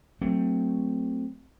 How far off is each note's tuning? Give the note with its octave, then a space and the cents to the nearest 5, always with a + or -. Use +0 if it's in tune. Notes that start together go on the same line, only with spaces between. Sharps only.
F#3 +0 A3 +20 C4 +0